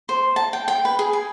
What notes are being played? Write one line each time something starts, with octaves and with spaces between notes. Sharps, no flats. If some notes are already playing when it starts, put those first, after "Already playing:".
C5
A5
G5
G5
B4
G#4
G#5